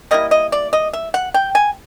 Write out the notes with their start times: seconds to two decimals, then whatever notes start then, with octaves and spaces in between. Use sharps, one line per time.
0.11 G3 A#3 E4 D#5
0.31 D#5
0.52 D5
0.73 D#5
0.93 E5
1.14 F#5
1.34 G5
1.55 G#5